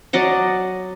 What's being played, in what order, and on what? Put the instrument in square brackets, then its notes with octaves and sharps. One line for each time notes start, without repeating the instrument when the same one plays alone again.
[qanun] F#3 D5 D#5 F#5